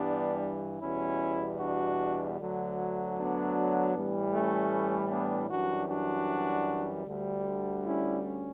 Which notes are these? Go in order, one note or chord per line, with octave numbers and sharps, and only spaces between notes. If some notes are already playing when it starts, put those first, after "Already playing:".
Already playing: G2 E3 G3 B3 D4
E2 B2 G3 C#4 E4
D4 F#4
D2 D3 F#3
B3 D4
A2 E3 G3
A3 C#4
B3 D4
F#2 E3 G3 D4 F#4
D4 F#4
D2 D3 G3
C#4 E4
C#4